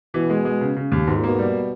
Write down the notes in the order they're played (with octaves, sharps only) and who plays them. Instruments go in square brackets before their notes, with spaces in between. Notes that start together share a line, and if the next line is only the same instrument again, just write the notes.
[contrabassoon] B2 [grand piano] E3
[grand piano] G#3
G#3
C#3
C#3
D#2
[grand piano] G#2 [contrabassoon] B2
[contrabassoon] A#2
[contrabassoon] B2 [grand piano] A#3
[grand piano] G3